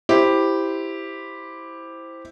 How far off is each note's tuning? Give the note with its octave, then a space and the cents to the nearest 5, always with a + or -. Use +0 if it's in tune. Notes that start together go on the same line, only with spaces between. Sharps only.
E4 +0 G4 +0 C5 +0